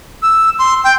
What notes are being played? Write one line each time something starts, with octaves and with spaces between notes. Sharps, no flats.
E6
C6
G5